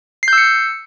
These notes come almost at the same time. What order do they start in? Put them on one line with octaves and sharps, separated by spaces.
C7 G6 E6 C#7